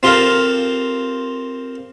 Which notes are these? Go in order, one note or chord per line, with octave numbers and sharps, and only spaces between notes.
C4 F4 G4 A4 A#4 F5